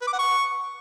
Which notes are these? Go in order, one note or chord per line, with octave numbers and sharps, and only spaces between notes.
B4
D6
F#5
C#6